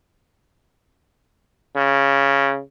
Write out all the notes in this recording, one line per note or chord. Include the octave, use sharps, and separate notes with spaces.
C#3